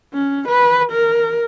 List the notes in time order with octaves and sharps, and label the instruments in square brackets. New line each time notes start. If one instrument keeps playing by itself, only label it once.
[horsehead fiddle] C#4
B4
A#4